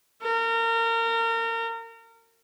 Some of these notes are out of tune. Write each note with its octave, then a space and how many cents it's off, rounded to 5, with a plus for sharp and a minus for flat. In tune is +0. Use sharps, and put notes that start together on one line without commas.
A#4 -30